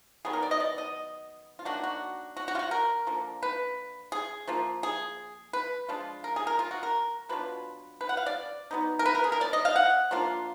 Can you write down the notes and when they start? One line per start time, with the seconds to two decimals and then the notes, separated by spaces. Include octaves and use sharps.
0.25 D#3 F#3 B3 G#4
0.33 A#4
0.42 D5
0.51 D#5
0.60 D5
0.78 D#5
1.59 F4
1.65 D#3 F#3 A#3 D4 F#4
1.83 F#4
2.37 F#4
2.48 F#4
2.55 F4
2.59 F#4
2.71 A#4
3.07 D3 F3 A#3
3.43 B4
4.12 G#4
4.47 F3 A#3 F4
4.83 G#4
5.53 B4
5.88 F3 G#3 D4 F4
6.24 A#4
6.36 G#4
6.47 A#4
6.59 F4
6.71 F#4
6.83 A#4
7.29 B2 F#3 D4 F4 B4
8.01 B4
8.09 F#5
8.17 F5
8.26 D5
8.71 F#3 B3 D#4
8.99 A#4
9.06 B4
9.15 A#4
9.24 G#4
9.32 A#4
9.41 D5
9.53 D#5
9.65 F5
9.76 F#5
10.11 F3 A#3 D4 F4